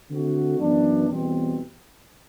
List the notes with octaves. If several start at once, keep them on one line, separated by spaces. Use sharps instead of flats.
D3 A3 C4 F#4
F#2 E3 B3 D4
E2 B2 G3 C4